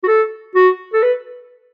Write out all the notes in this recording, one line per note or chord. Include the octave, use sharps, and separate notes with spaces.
F#4
A4
F#4
A4
B4